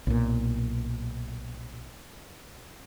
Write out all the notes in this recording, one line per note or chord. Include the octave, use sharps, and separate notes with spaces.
B1 A#2